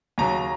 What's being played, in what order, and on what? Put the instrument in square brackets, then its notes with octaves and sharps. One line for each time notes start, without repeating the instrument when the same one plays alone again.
[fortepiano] D#2 C#3 F#3 [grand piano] A#5